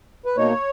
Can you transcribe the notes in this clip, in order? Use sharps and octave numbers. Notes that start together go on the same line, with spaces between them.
B4
B2 A#3 D#4 C#5